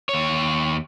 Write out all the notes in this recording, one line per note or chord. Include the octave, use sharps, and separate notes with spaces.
D#2 C#5